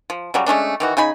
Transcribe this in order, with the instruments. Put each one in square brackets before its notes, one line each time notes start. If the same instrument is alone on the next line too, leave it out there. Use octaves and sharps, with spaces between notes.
[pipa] F3
C#3 F#3 G3
G#3 A3 C#4 D4
D#3 E3 F#4
C#3 D#4 G#5 B5